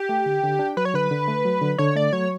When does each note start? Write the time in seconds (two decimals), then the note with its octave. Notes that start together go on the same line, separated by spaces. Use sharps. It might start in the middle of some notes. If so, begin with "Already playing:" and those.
Already playing: G4
0.09 A3
0.26 D3
0.43 D3
0.59 D4
0.77 F#3 B4
0.85 C#5
0.94 D3 B4
1.11 D3
1.28 A3
1.45 F#3
1.62 D3
1.78 D3 C#5
1.96 A3 D5
2.12 F#3 C#5